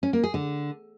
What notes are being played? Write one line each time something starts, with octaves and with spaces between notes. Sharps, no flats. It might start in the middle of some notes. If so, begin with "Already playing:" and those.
C#4
A#3
G#4
D3